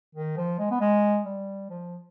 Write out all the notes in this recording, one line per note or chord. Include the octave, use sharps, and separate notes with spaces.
D#3
F3
G#3
B3
G#3
G3
F3